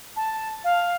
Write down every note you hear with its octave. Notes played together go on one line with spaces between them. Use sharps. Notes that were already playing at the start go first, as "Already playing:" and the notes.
A5
F5